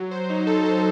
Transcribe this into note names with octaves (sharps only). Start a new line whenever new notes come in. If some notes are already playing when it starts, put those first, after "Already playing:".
Already playing: F#3
C5
D#4
A4
C5